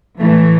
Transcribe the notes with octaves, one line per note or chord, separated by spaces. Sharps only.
A2 E3 A3